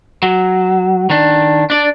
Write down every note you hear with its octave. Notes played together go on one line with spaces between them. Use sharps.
F#3
D#3 D4
D4 D5